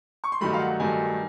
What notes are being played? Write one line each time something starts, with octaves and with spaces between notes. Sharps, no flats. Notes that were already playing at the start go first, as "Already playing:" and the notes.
C#6
C6
G2 D#3 F#3 A3 B5
F5
F#5
G2 D#3 F#3 A3 G#5